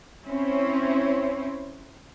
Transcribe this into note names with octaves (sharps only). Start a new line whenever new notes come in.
C4 C#4 E4 C5 C#5